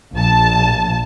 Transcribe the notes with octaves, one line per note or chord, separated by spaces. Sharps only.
A#1 A5